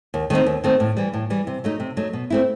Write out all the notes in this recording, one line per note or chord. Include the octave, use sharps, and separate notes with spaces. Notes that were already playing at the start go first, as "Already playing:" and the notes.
D#2
D#3 A3 C4 D#4
D#2
D#3 A3 C4 D#4
A2
E3 G3
A2
E3 G3
C3
F#3 A3 D#4
C3
F#3 A3 D#4
B2
A3 C4 E4